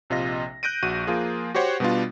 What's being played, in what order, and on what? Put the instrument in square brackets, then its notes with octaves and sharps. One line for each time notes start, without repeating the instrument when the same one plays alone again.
[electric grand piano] A#1 C3 F4 D#5 A#6
F#6 G6 A#6 D7 D#7
A#1 F#4 D#7
F3 A#3 F4 G#4
F#4 G4 C5 C#5 F#5
B2 G3 B3 D4 F4